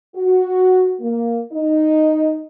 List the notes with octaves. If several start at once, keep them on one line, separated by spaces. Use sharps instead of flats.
F#4
A#3
D#4